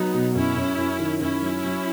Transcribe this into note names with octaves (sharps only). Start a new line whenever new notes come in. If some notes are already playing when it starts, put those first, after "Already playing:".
Already playing: F#3 B3 D#4
B2
F#2 C#4 E4
F#2
F#2
D#3
F#2 C#4 E4
F#3
F#3